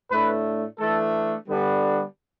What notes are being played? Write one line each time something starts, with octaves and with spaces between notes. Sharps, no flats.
A2 A3 D4 B4
E3 A3 D4 A4
D3 G3 B3 D4